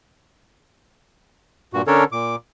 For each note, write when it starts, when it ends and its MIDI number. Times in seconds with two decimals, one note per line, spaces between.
1.74 1.82 43
1.74 1.82 46
1.74 1.82 66
1.87 2.04 50
1.87 2.04 61
1.87 2.04 62
1.87 2.04 69
1.87 2.04 70
1.87 2.04 73
2.12 2.36 46
2.12 2.36 86